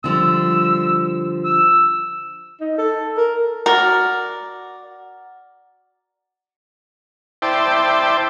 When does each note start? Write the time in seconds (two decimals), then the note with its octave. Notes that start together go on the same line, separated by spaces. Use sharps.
0.04 D3 F3 G3 E6
1.45 E6
2.60 D#4
2.78 A4
3.17 A#4
3.66 F#4 A#4 D5
7.42 E4 C5 D5 G5 A5